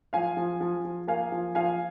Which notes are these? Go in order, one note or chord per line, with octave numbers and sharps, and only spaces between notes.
F3 F5 G#5
F3
F3
F3
A#3 F5 G#5
F3
F3 F5 G#5